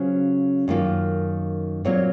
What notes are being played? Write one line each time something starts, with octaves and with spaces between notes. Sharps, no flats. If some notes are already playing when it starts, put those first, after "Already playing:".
Already playing: C#3 F#3 C#4 F4 C5
F#2 D#3 A#3 F4
A#2 F#3 C4 F4 C#5